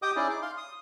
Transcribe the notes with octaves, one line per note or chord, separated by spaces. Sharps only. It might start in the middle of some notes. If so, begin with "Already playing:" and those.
G4 D#5 G5 D6 D#6
C#4 D#4 E4 G#4 D5
D6
F5 C6
D#6